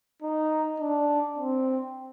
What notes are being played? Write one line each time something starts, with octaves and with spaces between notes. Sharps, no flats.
D#4
D4
C4